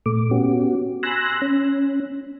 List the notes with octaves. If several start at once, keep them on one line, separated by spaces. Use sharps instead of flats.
A#2 A3 D6
B3 C#4 F#4 G4
G#5 B5 C6 E6 F#6 A#6
C#4